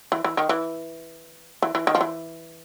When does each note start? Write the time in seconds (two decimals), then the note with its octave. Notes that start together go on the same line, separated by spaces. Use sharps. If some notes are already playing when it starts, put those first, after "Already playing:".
0.12 E3
0.24 E3
0.37 D#3
0.49 E3
1.62 E3
1.75 E3
1.87 D#3
1.95 F3
2.01 E3